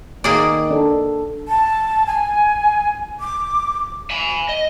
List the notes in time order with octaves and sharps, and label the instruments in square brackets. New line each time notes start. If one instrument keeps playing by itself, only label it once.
[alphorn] D#3 [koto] A#3 G#4 D5
[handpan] D4 A4
[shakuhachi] A5
G#5
D6
[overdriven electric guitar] G#5 B5
D#5